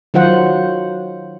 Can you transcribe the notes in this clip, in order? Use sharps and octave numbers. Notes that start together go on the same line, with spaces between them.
D#3 F#3 F4 C5 F#5